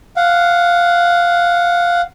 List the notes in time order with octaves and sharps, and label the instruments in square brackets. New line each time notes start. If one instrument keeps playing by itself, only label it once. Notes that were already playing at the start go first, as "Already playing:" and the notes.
[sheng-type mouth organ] F5 F#5